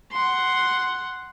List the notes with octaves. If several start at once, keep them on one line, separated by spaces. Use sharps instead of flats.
F#5 C6